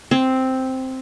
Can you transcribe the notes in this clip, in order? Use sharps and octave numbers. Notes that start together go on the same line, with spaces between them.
C4